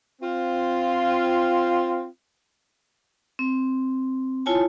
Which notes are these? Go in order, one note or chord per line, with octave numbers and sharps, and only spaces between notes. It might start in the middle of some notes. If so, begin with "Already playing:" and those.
C4 F4
C4
E4 F4 C#5 G#5 A5